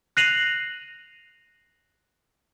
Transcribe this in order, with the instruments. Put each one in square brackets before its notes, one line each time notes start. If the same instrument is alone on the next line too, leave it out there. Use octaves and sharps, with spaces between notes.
[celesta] F#6 A#6 C7 D#7 F7 F#7